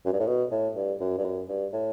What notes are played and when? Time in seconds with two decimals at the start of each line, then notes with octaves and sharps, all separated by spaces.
0.05 F#2
0.13 G2
0.20 A2
0.27 B2
0.51 A2
0.76 G2
1.01 F#2
1.18 G2
1.24 F#2
1.49 G2
1.73 A2